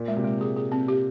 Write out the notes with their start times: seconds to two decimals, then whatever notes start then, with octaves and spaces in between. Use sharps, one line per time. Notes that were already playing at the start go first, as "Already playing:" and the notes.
Already playing: A#2
0.08 G#3
0.17 C3
0.25 G#3
0.41 G#4
0.56 G#4
0.72 C4
0.88 G4